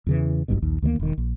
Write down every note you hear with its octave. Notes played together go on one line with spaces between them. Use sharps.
E2 C#3 E3
F#1 B1 G2 B2
A#1 D#2
D2 D#3 E3 A#3
E1 D#3
A#1